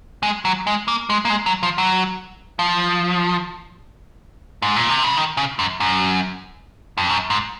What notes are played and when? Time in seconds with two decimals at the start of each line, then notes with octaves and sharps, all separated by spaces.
0.23 G#3
0.45 F#3
0.67 G#3
0.88 A#3
1.10 G#3
1.25 A#3
1.30 G#3
1.46 F#3
1.63 F3
1.78 F#3
2.59 F3
4.62 G#2
4.76 A#2
4.89 C3
5.03 C#3
5.17 D#3
5.37 C#3
5.59 F#2
5.80 F#2
6.98 F2
7.10 F#2
7.30 G#2